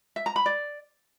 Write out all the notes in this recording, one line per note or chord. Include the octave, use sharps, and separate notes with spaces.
E5
A#5
B5
D5